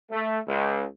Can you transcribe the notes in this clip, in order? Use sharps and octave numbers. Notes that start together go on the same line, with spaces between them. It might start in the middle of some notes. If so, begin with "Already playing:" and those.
A3
C#2